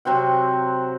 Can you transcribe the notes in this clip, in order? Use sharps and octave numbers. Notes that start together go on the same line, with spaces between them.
C3 F#3 C4 F#5